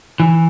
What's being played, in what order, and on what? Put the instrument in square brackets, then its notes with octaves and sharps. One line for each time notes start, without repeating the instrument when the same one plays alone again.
[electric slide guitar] E3